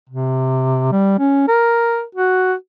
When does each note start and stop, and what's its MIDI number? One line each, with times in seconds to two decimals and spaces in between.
0.10 0.92 48
0.92 1.14 55
1.19 1.45 61
1.48 2.03 70
2.15 2.54 66